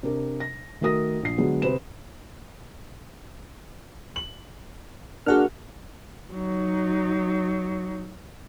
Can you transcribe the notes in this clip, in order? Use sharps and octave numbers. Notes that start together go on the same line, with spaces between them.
C3 D4 A#4
A#6
D#3 A3 F#4 A#4 D#6 A#6
A#1 C7
D3 F#3 G#3 B3
C3 B4 C5 E7
F#7
A#3 D4 F#4 G#4 F#5 F6
F#3 D#4